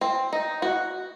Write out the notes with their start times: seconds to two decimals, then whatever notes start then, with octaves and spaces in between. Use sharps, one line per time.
0.01 C4
0.33 D#4
0.62 F#4